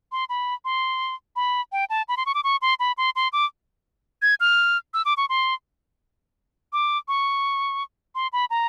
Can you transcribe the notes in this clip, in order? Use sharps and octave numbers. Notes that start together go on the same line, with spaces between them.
C6
B5
C6
B5
G5
A5
B5
C6
C#6
D6
C#6
C6
B5
C6
C6
D6
G#6
F6
E6
D6
C#6
C6
D6
C#6
C6
B5
A#5